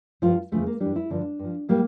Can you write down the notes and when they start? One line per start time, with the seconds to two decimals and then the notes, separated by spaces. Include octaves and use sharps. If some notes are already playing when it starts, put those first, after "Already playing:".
0.22 G2 F3 F4
0.52 E2 C#3 F3 A3
0.67 A#3
0.80 G2 E3 G3 D4
0.96 E4
1.10 G2 D3 F3 D4
1.39 G2 F3
1.69 A2 G3 A#3